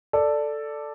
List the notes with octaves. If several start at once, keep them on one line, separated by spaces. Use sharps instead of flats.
A4 D5